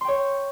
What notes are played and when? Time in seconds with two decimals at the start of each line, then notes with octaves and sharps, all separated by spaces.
0.01 C6
0.05 G5
0.08 C#5